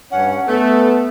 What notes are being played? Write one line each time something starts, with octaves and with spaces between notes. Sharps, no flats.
G2 C#4 F#5
A3 B3 A4